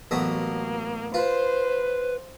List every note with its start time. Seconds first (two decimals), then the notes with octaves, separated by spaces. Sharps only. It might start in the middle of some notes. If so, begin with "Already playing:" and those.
0.11 A1 F#3 A#3 B3
1.14 F4 B4 C5